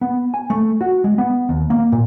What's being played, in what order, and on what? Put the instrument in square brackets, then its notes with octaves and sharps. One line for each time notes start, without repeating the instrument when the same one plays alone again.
[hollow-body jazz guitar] B3
G#5
A3
F#4
G#3
B3
D#2
A#3
A#2